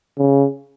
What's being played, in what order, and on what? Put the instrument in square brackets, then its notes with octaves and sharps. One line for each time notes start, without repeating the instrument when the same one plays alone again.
[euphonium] C#3